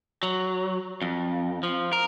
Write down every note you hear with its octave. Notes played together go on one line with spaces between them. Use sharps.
F#3
F2
F3
A#4